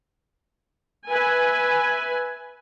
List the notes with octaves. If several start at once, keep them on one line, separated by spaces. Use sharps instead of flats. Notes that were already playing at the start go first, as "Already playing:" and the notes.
B4 E5 G#5